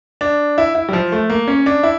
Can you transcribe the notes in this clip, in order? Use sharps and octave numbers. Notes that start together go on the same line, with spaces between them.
D4
E4
E4
G3
F3
A3
A#3
C#4
D4
E4